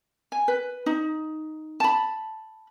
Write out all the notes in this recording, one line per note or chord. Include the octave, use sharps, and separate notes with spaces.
G#5
B4
D#4
A5 B5